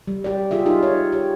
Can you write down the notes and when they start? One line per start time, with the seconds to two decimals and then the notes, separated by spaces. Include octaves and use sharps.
0.07 G3
0.24 G4 D5
0.51 F4 G4 G#4 E5
0.66 D#4 F4
0.83 C#5
1.12 G4